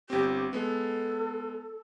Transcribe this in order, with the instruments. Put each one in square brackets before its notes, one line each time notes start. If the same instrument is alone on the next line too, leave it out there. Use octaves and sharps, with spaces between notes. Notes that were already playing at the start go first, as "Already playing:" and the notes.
[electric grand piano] G1 C4 [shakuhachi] G4
[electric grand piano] G#3 B3 [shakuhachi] A4